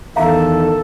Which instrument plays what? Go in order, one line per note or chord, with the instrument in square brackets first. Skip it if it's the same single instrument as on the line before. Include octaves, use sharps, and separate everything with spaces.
[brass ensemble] E2 D#3 [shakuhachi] A4 [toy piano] E5 F5 A#5